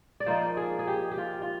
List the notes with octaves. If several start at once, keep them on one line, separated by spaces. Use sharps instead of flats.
D5
F3 A#3 D#4 C5
G#4
G#4
G4
G4
F4
F4